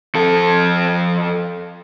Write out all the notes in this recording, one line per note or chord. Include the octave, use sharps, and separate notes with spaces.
F2 A4